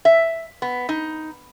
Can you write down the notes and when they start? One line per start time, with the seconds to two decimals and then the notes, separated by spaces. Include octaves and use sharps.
0.05 E5
0.62 B3
0.89 D#4